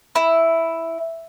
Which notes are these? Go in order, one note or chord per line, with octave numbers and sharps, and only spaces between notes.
E4